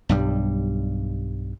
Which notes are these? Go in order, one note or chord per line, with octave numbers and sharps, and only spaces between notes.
B1 G2 G3